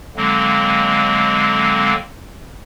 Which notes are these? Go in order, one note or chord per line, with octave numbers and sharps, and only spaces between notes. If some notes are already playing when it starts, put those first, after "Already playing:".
D3 F#3 G#3 A#3 C4